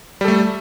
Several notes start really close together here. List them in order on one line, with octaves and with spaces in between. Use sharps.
G3 A4 A3